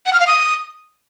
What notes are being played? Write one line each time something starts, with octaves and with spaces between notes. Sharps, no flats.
F#5
F6
F5
D#6